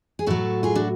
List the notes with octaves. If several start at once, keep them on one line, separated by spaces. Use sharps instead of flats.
G#4
A2 F#3 F#4 A4
F4 G#4
D4 F#4